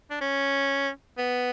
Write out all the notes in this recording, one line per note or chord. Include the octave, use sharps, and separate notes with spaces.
D4
C#4
B3